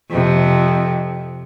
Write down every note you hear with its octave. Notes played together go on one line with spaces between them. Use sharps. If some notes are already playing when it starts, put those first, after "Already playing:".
F2 C3